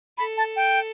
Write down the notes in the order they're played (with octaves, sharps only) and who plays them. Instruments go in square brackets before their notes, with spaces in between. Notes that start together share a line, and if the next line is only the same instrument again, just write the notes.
[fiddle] A4 [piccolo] B5
[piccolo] A5
G5